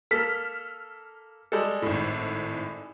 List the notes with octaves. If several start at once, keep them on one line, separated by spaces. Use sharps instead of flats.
A#3 A4 F6 B6
G3 G#3 A4
G#1 A2